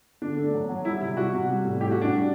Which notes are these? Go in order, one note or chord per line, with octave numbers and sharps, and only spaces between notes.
D3 D4
A3
F#3
F#3
G3 E4
C3 E4
G3 F#4
C3
G3
A2
A2 G4
F#4
A2 D4
G3